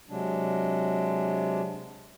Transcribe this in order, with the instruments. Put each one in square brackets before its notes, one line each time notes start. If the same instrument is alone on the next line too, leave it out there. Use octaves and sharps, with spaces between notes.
[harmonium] C3 F#3 G#3 D4